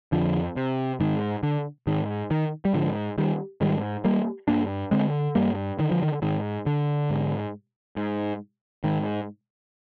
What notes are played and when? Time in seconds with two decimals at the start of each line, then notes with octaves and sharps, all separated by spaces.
0.12 F2 D3 F3
0.56 C3
1.00 G#2 D#3
1.43 D3
1.87 G#2 D#3
2.31 D#3
2.65 G3
2.74 G#2 D3 F3
3.18 D#3 G3
3.61 G#2 D#3 G3
4.04 G3 A#3
4.48 G2 A#3 D4
4.91 D3 G#3 C4
5.35 G2 G3 A#3
5.79 D3 D#3
5.91 F3
6.03 D#3
6.22 G#2 D#3
6.66 D3
7.10 G#2
7.96 G#2
8.84 G#2 D#3